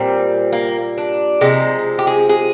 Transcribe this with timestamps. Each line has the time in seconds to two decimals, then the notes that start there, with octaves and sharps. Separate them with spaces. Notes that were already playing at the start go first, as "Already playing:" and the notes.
Already playing: A#2 G3 C4
0.52 A#3
0.98 D4
1.41 C3 F3 G#3 D#4
1.99 G4
2.07 G#4
2.29 G#4